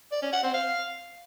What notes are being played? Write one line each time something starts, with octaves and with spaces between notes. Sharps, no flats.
D5
C#4
F#5
C4
F5